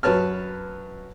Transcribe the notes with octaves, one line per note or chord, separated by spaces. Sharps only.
F#2 B4 C#5 A5 F6